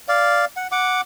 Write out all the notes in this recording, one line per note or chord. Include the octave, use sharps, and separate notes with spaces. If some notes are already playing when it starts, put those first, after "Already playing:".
D5 F5
F#5
F#5 D6